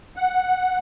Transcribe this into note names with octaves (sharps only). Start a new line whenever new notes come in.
F#5